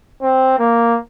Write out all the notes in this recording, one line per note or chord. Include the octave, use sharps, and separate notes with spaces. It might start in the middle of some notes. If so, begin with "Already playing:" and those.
C4
A#3